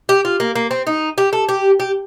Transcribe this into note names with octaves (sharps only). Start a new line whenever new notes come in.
G4
F4
A#3
A#3
C4
D#4
G4
A4
G4
G4